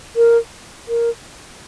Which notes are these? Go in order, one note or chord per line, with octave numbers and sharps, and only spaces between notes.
A#4
A#4